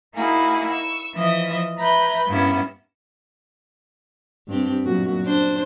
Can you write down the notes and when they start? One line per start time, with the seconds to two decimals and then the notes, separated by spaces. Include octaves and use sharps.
0.16 A#3 D#4 E4 F#4 G#4
0.70 C#6 E6
1.16 E3 F3 D#5 E5 D#6
1.77 B4 E5 A#5 B5 G6
2.28 G2 A#3 B3 C#4 E4
4.48 G2 C4 G4
4.84 F#2 A#2 F#4
5.25 D4 C5